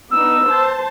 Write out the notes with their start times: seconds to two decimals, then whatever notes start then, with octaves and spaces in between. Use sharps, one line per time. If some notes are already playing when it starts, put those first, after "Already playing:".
0.11 B3 D4 D#4 E6
0.47 C5 A5